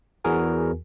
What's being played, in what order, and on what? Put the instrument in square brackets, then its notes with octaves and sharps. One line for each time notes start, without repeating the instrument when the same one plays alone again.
[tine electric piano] E2 E3 F#4 G#4 A#4 G#5